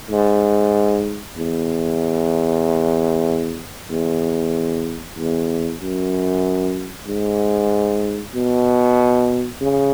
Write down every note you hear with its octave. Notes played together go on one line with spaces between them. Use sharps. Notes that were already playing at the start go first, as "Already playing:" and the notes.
G#2
E2
E2
E2
F#2
G#2
B2
C#3